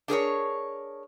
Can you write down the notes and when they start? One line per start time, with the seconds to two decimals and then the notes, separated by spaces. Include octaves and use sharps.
0.08 D4 G#4 A#4 C#5